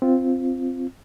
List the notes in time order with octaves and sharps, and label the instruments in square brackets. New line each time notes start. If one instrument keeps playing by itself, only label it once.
[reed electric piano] C4 F4